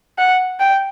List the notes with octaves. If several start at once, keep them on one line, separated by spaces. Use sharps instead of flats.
F#5
G5